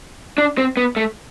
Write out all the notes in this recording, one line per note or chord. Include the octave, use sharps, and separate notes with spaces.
D4
C4
B3
A3